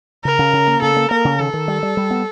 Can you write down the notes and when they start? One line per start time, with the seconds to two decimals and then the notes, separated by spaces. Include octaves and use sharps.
0.25 C#3 A#4
0.39 C#3
0.53 C#3
0.68 A#3
0.82 C#3 A4
0.97 A#3
1.11 A#3 A#4
1.25 C#3
1.39 D#3 A4
1.54 D#3
1.68 G3
1.83 G3
1.97 G3
2.11 B3